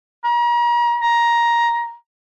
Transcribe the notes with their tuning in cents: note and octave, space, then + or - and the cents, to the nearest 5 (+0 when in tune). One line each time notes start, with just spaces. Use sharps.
A#5 +40
A#5 +10